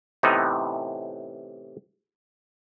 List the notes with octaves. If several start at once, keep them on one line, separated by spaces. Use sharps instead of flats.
A2 C3 E3 B3 D#4